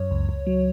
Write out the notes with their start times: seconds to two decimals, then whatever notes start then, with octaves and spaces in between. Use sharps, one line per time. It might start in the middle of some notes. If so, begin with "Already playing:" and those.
Already playing: F#2 C#5
0.11 C#2
0.29 C#2
0.47 F#3